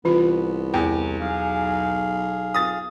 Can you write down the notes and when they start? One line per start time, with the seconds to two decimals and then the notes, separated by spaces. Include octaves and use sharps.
0.05 C2 E3 B3 F4
0.74 E2 G5
1.20 B1 G#4 F5
2.54 D#6 A6